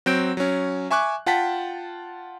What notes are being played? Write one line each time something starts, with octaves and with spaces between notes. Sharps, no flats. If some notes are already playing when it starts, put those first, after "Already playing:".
F#3 C4 G6 D7
F#3 C#4
E5 G#5 C#6 D6 F#6
F4 F#5 G5 A5 B6